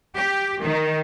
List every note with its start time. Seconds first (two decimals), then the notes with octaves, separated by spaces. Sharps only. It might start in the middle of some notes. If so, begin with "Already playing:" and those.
0.14 G4
0.61 D#3